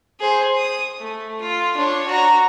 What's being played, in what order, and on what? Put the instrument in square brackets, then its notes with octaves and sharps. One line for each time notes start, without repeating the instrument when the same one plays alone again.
[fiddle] G#4 C5
D#6
A3
F4
D4 C#5
F#4 A#5